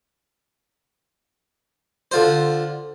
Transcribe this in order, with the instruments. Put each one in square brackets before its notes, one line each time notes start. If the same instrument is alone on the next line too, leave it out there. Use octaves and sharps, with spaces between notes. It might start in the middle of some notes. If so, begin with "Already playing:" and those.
[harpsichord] D3 F4 C5